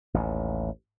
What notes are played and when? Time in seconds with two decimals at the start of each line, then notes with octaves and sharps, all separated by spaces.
0.14 A1 D#2